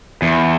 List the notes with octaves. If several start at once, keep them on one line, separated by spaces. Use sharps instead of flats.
E2